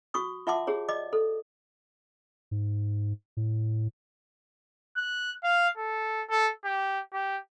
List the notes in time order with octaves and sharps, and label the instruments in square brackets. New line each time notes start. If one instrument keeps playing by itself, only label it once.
[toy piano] F#4 C#6 D#6
F4 E5 F#5 A5 C6 D6
G4 G#4 C#5
D5 D#5 D6
A4
[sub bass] G#2
A2
[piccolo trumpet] F#6
F5
A4
A4
G4
G4